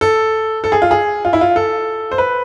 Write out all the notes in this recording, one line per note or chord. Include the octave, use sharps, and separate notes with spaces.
A4
A4
G#4
F4
G#4
F4
E4
F4
A4
C5
B4